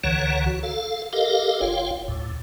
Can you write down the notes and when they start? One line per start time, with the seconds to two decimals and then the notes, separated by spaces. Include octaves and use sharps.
0.04 C#2 D3 E3 C#5 F#5 A#5
0.46 F#4
0.63 A4 F5
1.13 G4 A4 A#4 D#5 F5
1.61 F#1 F4 C#5 F5 G5
2.08 D2 A2